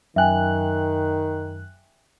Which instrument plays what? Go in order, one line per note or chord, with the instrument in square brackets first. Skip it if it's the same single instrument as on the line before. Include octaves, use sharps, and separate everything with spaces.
[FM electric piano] F#2 F#6 [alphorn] D#3 [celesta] E5 G5 G#5